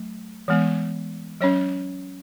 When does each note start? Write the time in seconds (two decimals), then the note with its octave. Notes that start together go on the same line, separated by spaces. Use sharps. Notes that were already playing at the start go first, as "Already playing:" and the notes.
Already playing: F#3 A3
0.48 E3 G#3 B3
1.41 F#3 C#4 C#5